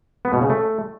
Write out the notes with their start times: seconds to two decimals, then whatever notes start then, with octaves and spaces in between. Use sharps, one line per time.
0.25 B3
0.33 B2
0.41 C#3
0.50 A3